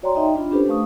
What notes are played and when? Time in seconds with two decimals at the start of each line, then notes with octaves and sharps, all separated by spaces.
0.03 F#4 C#5 D5 G5 A#5 C6
0.15 D#4 D#5 E5 G5
0.35 D4 F4 B5
0.51 C#4 D4 G4 A4 B4 C5
0.69 A3 F5 C#6 D#6